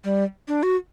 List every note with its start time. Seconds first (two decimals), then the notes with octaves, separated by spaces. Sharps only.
0.04 G3
0.48 D4
0.63 F#4